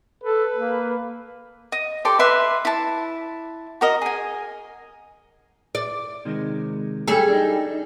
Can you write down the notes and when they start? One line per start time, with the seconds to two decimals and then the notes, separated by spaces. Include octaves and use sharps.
0.24 A4 B4
0.55 A#3
1.72 D#5
2.05 G4 A4 D5 C6
2.19 B4 D#5 E5 C6
2.65 E4 A5
3.81 F#4 A#4 D#5
4.02 G#4 G#5
5.75 D5
6.25 C3 D#3 G#3
7.08 G3 C#4 G#4 A4
7.28 D4 D#4